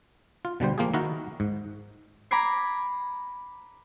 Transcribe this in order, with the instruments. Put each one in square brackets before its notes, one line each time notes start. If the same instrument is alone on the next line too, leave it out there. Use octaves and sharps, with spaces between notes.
[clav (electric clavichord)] F4
B2 D3 G3 C5
F3 A#3 F4 G4 G#4
D#3 D#4 E4 F#4 A#4
G#2
[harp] A#5 B5 D6 G#6 C7